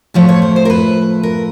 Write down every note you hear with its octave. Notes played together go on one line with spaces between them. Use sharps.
A2 F3 A3 C#5
C#5
C5
C5
A#4
B4
A#4